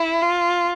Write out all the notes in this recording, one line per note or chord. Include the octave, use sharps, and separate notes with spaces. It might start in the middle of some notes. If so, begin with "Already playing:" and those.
Already playing: E4
F4